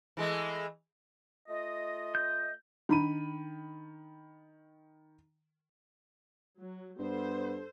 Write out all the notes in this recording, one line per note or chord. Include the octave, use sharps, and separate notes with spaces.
E3 G#3 A3
A3 F4 D#5
G6
D#3 D4 A#5 B5 D#7
F#3
G2 B3 A4 C5